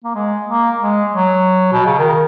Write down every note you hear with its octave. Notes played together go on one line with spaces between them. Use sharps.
A#3
G#3
A#3
G#3
F#3
B2
C#3
D#3